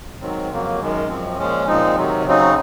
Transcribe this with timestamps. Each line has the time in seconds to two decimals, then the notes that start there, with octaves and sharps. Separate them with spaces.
0.21 G#2 D#3 F#3 C4
0.50 F2 C#3 F#3 A#3
0.80 F#2 D#3 G#3
1.08 F#2 F3 C4
1.38 A#2 F3 G#3 C#4
1.67 A#2 F3 G#3 C4 D#4
1.96 C3 D#3 F#3
2.25 C#3 F#3 C4 D#4